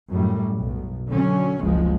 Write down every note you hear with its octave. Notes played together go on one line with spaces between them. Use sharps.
F#2 A2 G3
B1
D3 F#3 C#4
F#1 C#2 F3 G#3